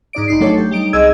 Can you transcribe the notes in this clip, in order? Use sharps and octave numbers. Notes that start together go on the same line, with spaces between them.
G#2 D#4 D5 D7
A1 D#4 C7
F#3 A3 D4 A4 C#5
G4
G3 D#4 D7
C2 G#4 D#5 E6 G#6